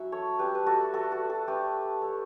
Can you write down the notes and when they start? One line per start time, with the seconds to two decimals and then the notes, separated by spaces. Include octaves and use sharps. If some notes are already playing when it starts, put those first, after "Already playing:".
Already playing: F#3 C#4 E4 E5 F#5 A5
0.12 A4 C#5
0.39 G3 D4 G4 B4
0.55 B4
0.66 F#4 A4
0.93 F#4 A4
1.12 F#4
1.30 F#4 A4
1.48 A3 D4 G4 B4
2.02 A4 C#5